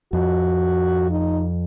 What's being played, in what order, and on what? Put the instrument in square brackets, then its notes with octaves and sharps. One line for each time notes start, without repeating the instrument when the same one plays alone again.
[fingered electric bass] F2 [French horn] F#4
[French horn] D#4